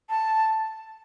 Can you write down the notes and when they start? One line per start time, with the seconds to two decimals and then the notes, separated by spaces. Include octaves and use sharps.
0.09 A5